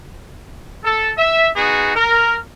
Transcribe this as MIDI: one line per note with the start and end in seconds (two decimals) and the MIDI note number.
0.84 1.10 69
1.18 1.49 76
1.56 1.93 59
1.56 1.93 63
1.56 1.93 66
1.56 1.93 68
1.95 2.36 70